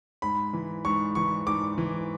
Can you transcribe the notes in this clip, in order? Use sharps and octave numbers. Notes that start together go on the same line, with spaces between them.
G#2 B5
E3
G#2 C#6
E3 C#6
G#2 D6
E3